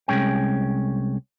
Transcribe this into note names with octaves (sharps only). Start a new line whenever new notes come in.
C2 D3 G#3 C#4 G5